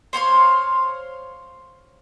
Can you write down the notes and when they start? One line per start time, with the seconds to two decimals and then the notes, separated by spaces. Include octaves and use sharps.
0.13 C5 C#5 F5 C6